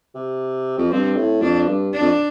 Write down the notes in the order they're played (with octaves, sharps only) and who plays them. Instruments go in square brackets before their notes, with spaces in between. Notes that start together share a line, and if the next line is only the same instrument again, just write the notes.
[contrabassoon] C3
F2
[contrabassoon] G2 [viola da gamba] C4
[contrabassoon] A2
[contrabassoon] F2 [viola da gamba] D4
[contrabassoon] G2
[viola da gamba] D4
[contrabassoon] F2